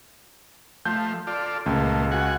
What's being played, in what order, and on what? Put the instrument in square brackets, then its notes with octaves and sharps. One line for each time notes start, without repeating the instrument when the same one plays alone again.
[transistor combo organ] F3 A3 [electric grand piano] G6
[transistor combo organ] F4 A4 D5
[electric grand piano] C#2 [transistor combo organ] A#2 A3
[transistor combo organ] F#4 F#5 G#5